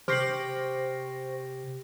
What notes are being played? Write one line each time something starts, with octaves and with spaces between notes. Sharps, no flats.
C3 G4 C5 C#6 F6 A#6 C7 F#7